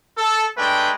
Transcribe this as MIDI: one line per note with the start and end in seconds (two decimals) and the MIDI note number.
0.17 0.45 69
0.57 0.91 56
0.57 0.91 57
0.57 0.91 62
0.57 0.91 71
0.57 0.91 79